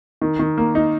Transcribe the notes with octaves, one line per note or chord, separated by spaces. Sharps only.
D#3
D#3
A#3
D#4